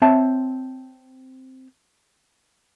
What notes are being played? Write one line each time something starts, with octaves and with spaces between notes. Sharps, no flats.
C4 C#5 E5 A5